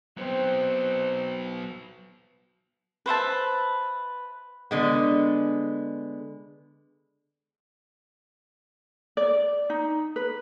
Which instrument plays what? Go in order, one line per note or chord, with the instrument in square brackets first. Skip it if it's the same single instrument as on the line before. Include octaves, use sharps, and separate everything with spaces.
[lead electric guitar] F#3 B3 [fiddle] C4
[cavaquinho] B4 C5 E5 A5
[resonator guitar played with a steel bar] D3 G#3 B3
[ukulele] D5
D#4
B4